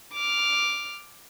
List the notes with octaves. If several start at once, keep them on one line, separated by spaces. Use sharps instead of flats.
D6 F6